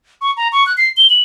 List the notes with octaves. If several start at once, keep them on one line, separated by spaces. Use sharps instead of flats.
C#6
A#5
C#6
F#6
C7
G7
F#7